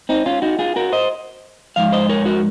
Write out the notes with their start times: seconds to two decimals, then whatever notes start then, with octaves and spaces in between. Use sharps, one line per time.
0.09 C4 D#4
0.26 C#4 F4
0.42 D#4 F#4
0.59 F4 G#4
0.76 F#4 A#4
0.92 C5 D#5
1.76 G#2 F3 F5
1.92 C5 D#5
2.09 A#4 C#5
2.25 F#4 A#4